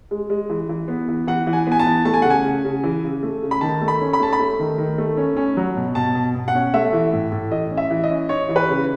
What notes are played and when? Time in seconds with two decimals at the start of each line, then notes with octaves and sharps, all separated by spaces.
0.11 G#3
0.30 G#3
0.50 E3
0.69 E3
0.88 B3
1.08 E3
1.27 E3 F#5
1.47 E3
1.53 G#5
1.67 B3 G#5
1.79 A5
1.86 E3
2.05 A3 A5
2.14 G#5
2.22 C#3 F#5
2.30 G#5
2.44 C#3
2.65 C#3
2.84 E3
3.04 C#3
3.23 A3
3.42 C#3
3.51 B5
3.61 D#3 A5
3.81 A3
3.88 B5
4.01 C#4
4.13 B5
4.20 A3 A5
4.33 B5
4.40 A3
4.59 D#3
4.78 D#3
4.98 A3
5.17 C#4
5.37 C#4
5.57 F#3
5.76 B2
5.95 B2 A5
6.15 B2
6.35 B2
6.48 F#5
6.55 C#4
6.74 A3 E5
6.93 E3
7.13 A2
7.32 A2
7.51 E3 D#5
7.71 C#4
7.77 E5
7.90 E3
8.04 D#5
8.10 C#4
8.29 D#4 C#5
8.49 E3
8.56 B4
8.69 C#3